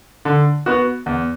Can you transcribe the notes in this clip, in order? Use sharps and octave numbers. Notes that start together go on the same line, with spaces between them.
D3
B3 F#4
E2